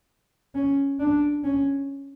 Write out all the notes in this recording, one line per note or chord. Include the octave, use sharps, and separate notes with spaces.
C#4
D4
C#4